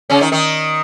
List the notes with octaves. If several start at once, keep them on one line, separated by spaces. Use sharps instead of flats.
C#3 C#4
D#3 D#4
D#3 D#4